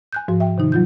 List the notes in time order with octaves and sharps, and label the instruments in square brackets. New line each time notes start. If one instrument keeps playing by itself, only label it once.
[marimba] G#5 F#6 G6
G#2 F3 F#4
E5 G5
C3 D#3 D#4
F#3 F4 G6